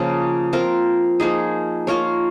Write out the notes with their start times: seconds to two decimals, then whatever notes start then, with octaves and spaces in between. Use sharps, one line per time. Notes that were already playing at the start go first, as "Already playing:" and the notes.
Already playing: C#3 F3 A#3
0.53 C4 F4 A#4
1.20 F3 A#3 D#4 G#4
1.87 A#3 F4 A#4 C#5